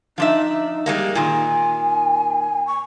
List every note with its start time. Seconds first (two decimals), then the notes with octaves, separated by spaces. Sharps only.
0.18 F3 D4 D#4 E5
0.86 G3 G#3 A#3
1.15 A#2 D#3 G#5
2.67 C#6